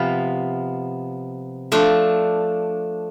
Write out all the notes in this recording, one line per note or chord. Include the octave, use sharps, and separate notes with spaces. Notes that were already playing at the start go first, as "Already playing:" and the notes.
Already playing: C3 F3 B3 F4
F3 A3 D4